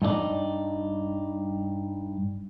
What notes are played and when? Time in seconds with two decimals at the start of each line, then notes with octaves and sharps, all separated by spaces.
0.02 G2 D#4 G#4 D5